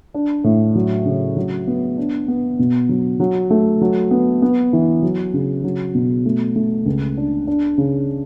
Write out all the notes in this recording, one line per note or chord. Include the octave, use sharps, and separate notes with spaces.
D4
A2
F#3
C#3
F#3
B3
D4
B3
B2
F#3
F#3
A3
F#3
B3
B3
E3
F#3
C#3
F#3
B2
A3
A3
C#2
D4
D4
C#3